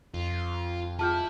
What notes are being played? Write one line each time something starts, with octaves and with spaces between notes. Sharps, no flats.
F2 F4
E4 F4 G#4 G5 A5 F6 G6